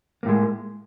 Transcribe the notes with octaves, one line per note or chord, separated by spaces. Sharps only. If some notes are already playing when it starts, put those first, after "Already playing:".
A2 G#3 A#3